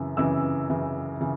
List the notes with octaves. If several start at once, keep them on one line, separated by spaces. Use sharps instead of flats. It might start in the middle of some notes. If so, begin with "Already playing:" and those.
Already playing: F#2 C#3 E3
F#2 C#3 E3 E6
F#2 C#3 E3
C#3 E3